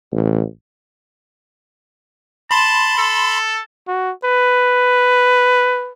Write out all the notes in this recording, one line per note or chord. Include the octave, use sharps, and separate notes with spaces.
A1
A5 B5 C6
A4
F#4
B4